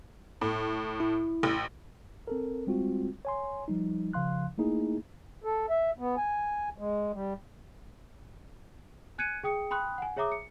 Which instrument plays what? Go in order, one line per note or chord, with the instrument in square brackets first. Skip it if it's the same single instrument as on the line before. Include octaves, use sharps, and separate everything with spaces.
[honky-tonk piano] A2
[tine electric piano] E4
[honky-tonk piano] A1
[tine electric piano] C4 A4 A#4
G3 G#3 C4 F4 F#4
C#5 G#5 C6
F3 G3 D#4
C#3 F3 F5 C6 F#6
A3 A#3 D#4 E4 G#4
[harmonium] A4
E5
B3
G#5
G#3
G3
[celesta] G#5 F#6 G#6 C#7 D#7
G#4 G5 D#6 C#7
G5 B5 C6 D#6 F#6
F#5 G#5
G#4 C#5 E5 A#5 D6 D#6
C#7